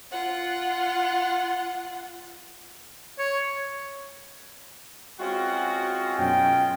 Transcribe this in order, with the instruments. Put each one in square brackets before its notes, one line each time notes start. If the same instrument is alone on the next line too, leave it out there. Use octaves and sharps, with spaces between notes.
[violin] F4 F#5
[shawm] C#5
[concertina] G#3 C#4 F4 [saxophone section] C4 F#4
[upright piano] F#2 B2 [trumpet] G5